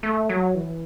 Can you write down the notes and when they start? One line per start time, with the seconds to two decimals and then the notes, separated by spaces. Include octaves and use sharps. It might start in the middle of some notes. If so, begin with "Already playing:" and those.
0.03 A3
0.29 F#3
0.55 E3